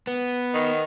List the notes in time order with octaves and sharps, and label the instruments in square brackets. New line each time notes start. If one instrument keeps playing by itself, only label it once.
[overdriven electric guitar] B3
[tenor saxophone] D#3